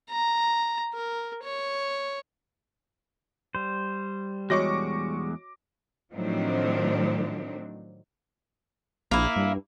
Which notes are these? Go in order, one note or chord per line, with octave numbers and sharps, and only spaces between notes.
A#5
A#4
C#5
G3 C5
E2 G#3 F#4 C#5 D#5 C#6 D6 A#6
A2 D#3 F3 F#3 C4 D4
A#1 A#3 E4
G2